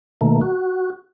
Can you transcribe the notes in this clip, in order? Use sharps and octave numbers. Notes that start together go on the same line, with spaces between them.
B2 D#3 A3 A#3
F#4